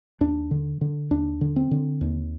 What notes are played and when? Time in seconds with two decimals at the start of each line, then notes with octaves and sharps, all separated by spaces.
0.21 D#2 D4
0.51 D3
0.81 D3
1.11 D#2 D4
1.41 D3
1.56 C4
1.71 D3
2.01 D#2